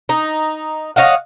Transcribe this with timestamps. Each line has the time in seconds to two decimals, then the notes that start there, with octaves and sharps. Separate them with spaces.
0.09 D#4
0.96 C#5 D#5 F5 F#5